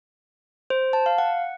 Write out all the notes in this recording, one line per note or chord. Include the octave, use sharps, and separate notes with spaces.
C5
A5
F5
F#5